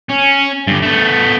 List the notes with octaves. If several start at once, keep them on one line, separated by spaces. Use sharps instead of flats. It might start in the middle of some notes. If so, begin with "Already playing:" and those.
C#4
G2 D3
A3 B3